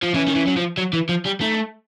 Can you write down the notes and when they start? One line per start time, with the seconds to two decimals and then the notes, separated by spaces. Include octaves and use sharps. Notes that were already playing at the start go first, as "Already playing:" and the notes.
0.03 F3
0.14 E3 C#4
0.28 D#3
0.35 E3
0.47 F#3
0.56 F3
0.77 F#3
0.93 E3
1.09 F3
1.26 G3
1.41 A3 D#4